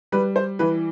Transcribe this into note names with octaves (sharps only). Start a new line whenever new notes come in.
G3 B4
C5
E3 B4